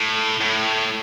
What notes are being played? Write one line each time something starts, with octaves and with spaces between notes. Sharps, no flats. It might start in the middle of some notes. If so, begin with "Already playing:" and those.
Already playing: A2
A2